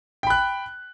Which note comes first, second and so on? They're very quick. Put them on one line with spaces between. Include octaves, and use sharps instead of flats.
G5 B5 F#6